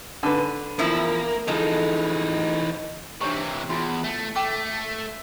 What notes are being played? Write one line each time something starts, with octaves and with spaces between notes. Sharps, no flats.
D3 B4
E2 F3 A#3 E4
E3 F3 G#3 D#4 A4
C3 E3 D4 C#5 C#6
E2 E4 F4 C6
A3
A3 G5 D6